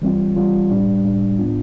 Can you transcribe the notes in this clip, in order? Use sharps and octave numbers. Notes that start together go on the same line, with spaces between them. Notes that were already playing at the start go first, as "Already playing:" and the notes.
E3 G3 C4 F4
E3 G3 C4 F4
A2 G3 D4
A2 G3 D4
A2 F3 B3 D4 F4